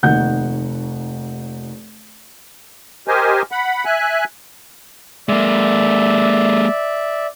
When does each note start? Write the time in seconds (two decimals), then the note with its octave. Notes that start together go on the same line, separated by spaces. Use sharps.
0.03 F1 D#2 D#4 F#5 G6
3.08 G4 A#4 C5 D#5 G#5
3.52 F#5 B5
3.85 E5 G#5 F#6
5.29 G#3 A#3 D5 E5